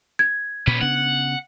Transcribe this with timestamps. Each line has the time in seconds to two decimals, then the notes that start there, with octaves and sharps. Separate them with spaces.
0.19 G#6
0.67 A#2 C#4 B4
0.81 C#3 B3 D4 F#5